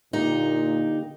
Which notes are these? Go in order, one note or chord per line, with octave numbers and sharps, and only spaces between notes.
A#2 D3 A#3 D#4 G4